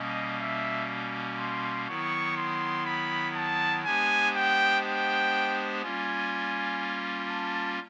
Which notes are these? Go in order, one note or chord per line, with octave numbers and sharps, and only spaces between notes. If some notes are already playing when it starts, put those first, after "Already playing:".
Already playing: B2 G3 A#3 C#4 D#5
E5
C6
D#3 F#3 B3 E4 C#6
C6
B5
A5
G#3 B3 D4 G4 C5 G#5
G5
G5
G3 A#3 C#4 F4 G#5
A5